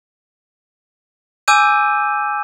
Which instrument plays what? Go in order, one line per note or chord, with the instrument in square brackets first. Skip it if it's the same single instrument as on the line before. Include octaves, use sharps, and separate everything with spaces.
[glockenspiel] G#5 D6 E6 G6 D#7